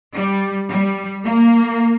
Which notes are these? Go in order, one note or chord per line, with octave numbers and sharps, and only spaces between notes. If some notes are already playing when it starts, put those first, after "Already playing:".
G3
G3
A#3